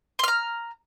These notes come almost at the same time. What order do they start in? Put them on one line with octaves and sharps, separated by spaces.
C6 F6 A#5